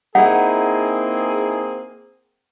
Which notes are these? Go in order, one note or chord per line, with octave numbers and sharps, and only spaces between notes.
A#3 C4 D#4 E4 G#4 F#5